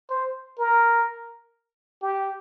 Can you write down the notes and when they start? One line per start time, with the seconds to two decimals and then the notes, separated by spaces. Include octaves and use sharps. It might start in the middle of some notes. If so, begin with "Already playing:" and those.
0.10 C5
0.59 A#4
2.02 G4